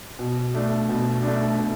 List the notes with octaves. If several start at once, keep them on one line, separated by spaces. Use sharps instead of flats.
B2
A3 D4
B2
A3 D4
B2